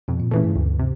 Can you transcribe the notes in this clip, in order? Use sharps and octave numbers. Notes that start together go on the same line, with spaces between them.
F2 B2
A#2
A#2 C#3 E3 A3
G2
D2
C3